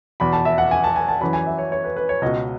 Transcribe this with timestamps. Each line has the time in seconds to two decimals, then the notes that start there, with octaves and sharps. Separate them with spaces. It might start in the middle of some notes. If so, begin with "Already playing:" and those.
0.20 E2 B2 B5
0.33 A5
0.45 E5
0.58 F#5
0.71 G#5
0.84 A5
0.96 G#5
1.08 A5
1.21 F#2 E3 B5
1.33 G#5
1.46 E5
1.58 C#5
1.72 C#5
1.84 B4
1.97 B4
2.09 C#5
2.22 C#2 B2 D#5